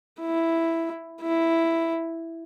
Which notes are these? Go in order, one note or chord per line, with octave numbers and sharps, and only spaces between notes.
E4
E4